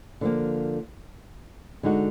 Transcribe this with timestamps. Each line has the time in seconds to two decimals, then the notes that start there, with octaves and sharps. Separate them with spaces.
0.21 D3 F3 A#3
1.83 D3 G#3 D#4 F#4